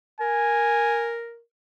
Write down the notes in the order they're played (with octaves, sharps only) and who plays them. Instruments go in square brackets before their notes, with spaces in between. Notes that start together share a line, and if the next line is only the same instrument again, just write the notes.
[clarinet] A#4 [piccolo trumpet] G#5